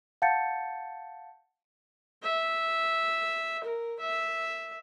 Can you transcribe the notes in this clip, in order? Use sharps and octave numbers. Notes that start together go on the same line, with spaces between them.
F5 F#5 A5 G6 A6 C#7
E5
A#4
E5